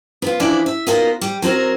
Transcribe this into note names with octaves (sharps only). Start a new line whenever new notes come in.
B3 F4
E3 F3 D4 E4 D5
E5
B3 D#4 F4 F#4 A#4 D#5
G3
F#3 C4 F#4 A#4